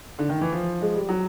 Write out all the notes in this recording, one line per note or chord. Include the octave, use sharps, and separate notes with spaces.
D3
D#3
E3
F3
G#3
G3
F#3